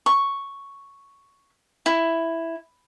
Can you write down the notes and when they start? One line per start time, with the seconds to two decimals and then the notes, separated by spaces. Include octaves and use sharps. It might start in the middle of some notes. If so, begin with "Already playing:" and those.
0.06 C#6
1.86 E4